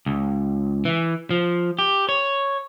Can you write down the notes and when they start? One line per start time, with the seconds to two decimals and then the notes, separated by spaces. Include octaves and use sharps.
0.06 C#2
0.85 E3
1.31 F3
1.79 G4
2.09 C#5